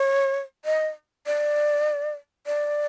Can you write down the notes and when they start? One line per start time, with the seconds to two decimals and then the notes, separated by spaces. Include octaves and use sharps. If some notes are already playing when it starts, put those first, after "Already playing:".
Already playing: C#5
0.65 D#5
1.26 D5
2.46 D5